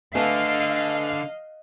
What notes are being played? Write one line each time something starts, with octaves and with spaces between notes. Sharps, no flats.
D3 A3 B4 D#5 F5 G#5